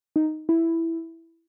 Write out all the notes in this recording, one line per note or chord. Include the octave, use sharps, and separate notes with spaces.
D#4
E4